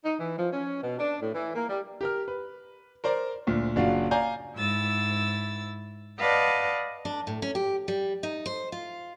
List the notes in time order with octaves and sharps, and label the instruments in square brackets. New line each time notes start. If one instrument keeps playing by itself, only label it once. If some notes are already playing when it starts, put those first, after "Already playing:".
[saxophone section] D#4
E3
F3
C#4
B2
D4
A2
E3
A#3
G3
[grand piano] G4 A#4 F6
B4
A#4 C5 D5 A#5
D2 A#2
F#1 D4 F4 F#4 F5
D5 F5 G#5 A#5 G6
[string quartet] G#2 E4 E6 A6
B4 D5 D#5 F5 F#5 A5
[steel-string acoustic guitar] D4
A2
C#4
G4
G3
D#4
C5
F4